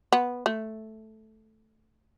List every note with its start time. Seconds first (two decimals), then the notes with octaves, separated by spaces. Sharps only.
0.13 B3
0.46 A3